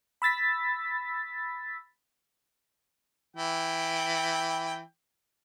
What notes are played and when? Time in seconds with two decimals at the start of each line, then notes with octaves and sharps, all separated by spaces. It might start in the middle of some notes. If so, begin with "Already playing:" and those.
0.22 B5 E6 A6 B6
3.36 E3 G5